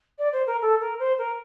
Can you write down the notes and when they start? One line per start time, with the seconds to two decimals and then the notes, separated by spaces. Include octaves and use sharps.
0.18 D5
0.32 C5
0.47 A#4
0.61 A4
0.81 A#4
0.99 C5
1.18 A#4